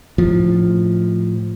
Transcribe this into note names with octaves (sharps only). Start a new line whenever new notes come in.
A2 F3